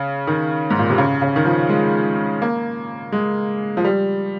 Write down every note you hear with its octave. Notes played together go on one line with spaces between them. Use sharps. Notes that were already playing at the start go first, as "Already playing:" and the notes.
Already playing: C#3
D#3
G#2
A#2
C3
C#3
C#3
D#3
F3
G#3
A#3
G#3
F3
G3